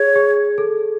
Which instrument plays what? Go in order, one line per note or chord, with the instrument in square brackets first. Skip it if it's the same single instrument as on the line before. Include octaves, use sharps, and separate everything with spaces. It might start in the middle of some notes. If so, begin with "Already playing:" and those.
Already playing: [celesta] G#4 [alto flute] C#5
[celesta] G#4
A4